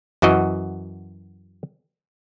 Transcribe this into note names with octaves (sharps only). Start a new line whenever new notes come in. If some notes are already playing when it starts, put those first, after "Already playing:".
F#2 E3 F#4 D#5